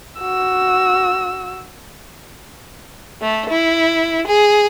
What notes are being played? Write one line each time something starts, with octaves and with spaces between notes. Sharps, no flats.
F#4 E6
A3
E4
G#4